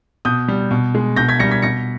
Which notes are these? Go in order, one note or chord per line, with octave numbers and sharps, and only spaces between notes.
B2 D#6 G6
G3
B2
G#3
B2 G6 A#6
G#6 B6
G3 A#6 C#7
G#6 B6
B2 A#6 C#7